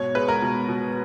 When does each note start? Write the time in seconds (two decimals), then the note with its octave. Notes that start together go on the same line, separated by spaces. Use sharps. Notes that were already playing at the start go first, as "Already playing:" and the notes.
Already playing: G#2 B2 C#5
0.15 G#3 B4
0.28 A#4
0.42 B2
0.69 B2